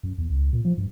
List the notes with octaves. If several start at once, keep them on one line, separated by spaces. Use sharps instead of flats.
F#2
E2
C#2
A#2
F3
G2